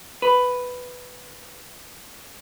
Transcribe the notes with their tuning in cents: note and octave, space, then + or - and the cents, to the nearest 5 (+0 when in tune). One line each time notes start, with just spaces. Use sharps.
B4 +5